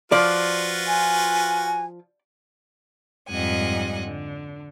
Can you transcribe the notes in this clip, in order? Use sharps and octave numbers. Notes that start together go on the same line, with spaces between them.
F3 F4 F#4 B4 D5
G#5
F2 G#2 G3 D#5 F#5 G#5
D3